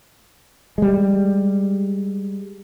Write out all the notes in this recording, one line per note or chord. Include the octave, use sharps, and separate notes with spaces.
G3 G#3